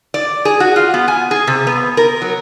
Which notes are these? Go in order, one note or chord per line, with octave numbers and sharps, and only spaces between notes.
D5
G#4
F#4
F4
B3
G#5
G#4
C3
B3
A#4
F#3